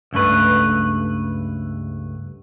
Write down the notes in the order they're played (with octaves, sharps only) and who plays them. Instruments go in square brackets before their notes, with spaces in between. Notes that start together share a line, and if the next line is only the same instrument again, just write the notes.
[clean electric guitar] C#2 G2 A3 B4